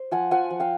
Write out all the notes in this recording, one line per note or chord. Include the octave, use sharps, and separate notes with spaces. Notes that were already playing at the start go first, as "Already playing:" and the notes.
Already playing: C5
F3 F#5 G#5
F3 F#5 G#5
F3
F5 G5